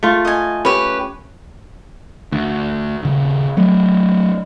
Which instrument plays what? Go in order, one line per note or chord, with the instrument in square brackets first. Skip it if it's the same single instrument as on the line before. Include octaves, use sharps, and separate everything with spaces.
[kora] A3 F4
[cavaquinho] D#5 G#5
[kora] C#4 [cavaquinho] G4 B4
[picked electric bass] D2
D#1 C#3
F#3 A3